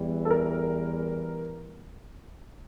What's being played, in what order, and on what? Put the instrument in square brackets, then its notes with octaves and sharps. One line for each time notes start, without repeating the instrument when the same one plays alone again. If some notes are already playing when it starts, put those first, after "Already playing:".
Already playing: [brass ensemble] E2 E3 G3
[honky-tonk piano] A4
A#4